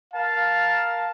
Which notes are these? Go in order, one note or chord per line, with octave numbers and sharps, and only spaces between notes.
A#4 F5 A5